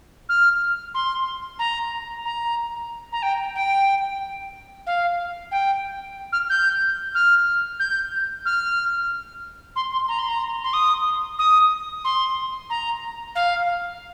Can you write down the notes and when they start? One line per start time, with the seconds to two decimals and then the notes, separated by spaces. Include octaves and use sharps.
0.29 F6
0.94 C6
1.59 A#5
2.25 A#5
3.12 A#5
3.23 G5
3.56 G5
4.87 F5
5.52 G5
6.33 F6
6.50 G6
7.15 F6
7.80 G6
8.46 F6
9.76 C6
9.92 C6
10.09 A#5
10.19 C6
10.29 A#5
10.64 C6
10.73 D#6
11.39 D#6
12.05 C6
12.70 A#5
13.35 F5